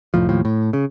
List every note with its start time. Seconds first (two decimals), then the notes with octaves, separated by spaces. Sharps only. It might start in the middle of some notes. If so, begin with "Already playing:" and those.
0.14 F1 A2 F3
0.29 D#2 A2 F3
0.45 A2
0.73 C#3